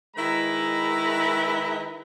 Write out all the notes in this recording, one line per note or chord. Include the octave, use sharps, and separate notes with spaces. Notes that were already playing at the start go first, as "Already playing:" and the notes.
D#3 G#3 E4 B4 A#5